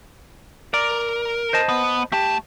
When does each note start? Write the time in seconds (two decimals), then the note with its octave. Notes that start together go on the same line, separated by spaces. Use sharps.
0.74 A#4 D5
1.53 C5 D#5 A5
1.69 B3
2.12 A3 G4 A5